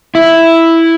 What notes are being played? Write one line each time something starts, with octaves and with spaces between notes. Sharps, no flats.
E4